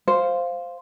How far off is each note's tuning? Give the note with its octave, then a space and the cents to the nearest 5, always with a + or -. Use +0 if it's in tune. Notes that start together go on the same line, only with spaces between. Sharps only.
C5 +0 F5 +0